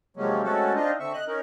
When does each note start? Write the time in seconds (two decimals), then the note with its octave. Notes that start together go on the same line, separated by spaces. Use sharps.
0.17 C3 F3 F#3 G#3 A#3 C#4
0.43 G#3 A3 C4 C#4 F#4 A4
0.75 C4 D4 D#4 F4 D#5
1.00 D3 C4 E5 C#6
1.13 D#5 F#6
1.27 C#4 D#4 A#4